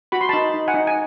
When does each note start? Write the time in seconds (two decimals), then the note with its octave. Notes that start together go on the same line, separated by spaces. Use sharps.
0.12 F#4 B5
0.21 C6
0.29 D#4 A5 B5
0.54 D#4
0.68 F#5 G#5
0.74 D#4
0.87 G#5